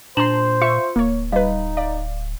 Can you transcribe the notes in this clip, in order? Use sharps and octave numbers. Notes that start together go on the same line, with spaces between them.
A#2 D4 C5 A5 A#5 C6 E7 F#7
F4 E5 C#6 C#7
D1 A#3 C#5
G3 D#4 B4 D#5 F5
D5 F5